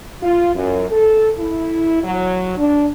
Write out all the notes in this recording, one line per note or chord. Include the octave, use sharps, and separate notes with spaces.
F4
F#2
A4
E4
F#3
D4